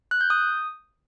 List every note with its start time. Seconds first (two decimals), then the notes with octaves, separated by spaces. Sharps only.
0.11 F#6
0.21 G6
0.30 D#6